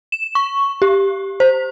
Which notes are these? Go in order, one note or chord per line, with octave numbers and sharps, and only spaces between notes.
E7
C#6
G4
C5